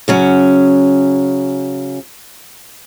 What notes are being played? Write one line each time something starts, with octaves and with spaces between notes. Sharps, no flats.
C#3 F#3 C#4